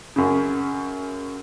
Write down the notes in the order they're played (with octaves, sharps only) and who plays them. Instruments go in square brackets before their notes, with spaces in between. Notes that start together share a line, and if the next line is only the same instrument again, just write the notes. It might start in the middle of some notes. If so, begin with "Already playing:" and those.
[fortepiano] F#2 C#3